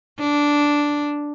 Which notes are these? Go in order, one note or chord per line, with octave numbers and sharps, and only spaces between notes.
D4